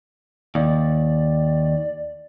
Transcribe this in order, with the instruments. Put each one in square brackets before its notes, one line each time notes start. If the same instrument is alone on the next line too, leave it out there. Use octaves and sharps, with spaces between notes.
[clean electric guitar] D#2 [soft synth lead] D5